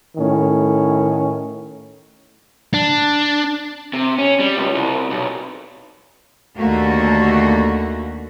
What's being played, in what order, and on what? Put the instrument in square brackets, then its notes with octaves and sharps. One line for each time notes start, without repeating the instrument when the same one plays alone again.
[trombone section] A2 D#3 C#4
[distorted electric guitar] D4
[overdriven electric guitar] C3
C#4
G3
C#2
C2
B1
[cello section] D#2 D3 A3 A#3 F#4